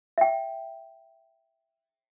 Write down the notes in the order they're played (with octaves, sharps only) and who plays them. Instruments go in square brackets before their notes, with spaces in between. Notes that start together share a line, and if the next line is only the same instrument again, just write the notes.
[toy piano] E5 G5